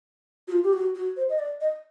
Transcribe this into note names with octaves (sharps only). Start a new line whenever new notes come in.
F#4
F4
G4
F#4
F#4
C5
D#5
D5
D#5